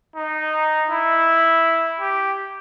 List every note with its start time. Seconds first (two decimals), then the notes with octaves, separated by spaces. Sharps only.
0.16 D#4
0.90 E4
2.00 G4